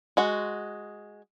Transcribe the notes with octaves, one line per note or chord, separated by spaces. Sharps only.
G#3 F#4